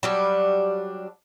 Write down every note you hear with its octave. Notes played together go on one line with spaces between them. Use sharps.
F#3 G3 D4